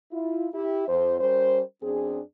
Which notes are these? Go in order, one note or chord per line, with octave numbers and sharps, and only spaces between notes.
E4 F4
E4 G4
F2 C5
G3 C#4 A#4 C5
F#2 C4 D4 G#4